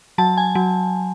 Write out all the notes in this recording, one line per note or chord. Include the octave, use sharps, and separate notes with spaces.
F#3 A5
G#5
F#3